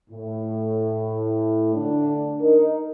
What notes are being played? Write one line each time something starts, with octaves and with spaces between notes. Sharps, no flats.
A2
D3 A3 D4
D#4 A#4